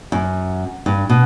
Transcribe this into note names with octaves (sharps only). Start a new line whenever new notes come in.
F#2
G2
B2